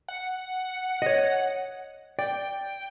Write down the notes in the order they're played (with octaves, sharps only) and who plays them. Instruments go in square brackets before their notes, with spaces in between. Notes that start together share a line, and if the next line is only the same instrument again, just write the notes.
[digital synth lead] F#5
[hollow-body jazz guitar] C#5 D#5
[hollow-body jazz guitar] D5 [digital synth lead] G5